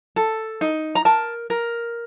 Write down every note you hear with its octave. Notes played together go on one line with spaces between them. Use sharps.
A4
D#4
A#5
A#4 A5
A#4